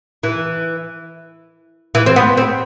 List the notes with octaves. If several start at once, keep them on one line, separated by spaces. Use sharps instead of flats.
E3
E3
C4
B3
C4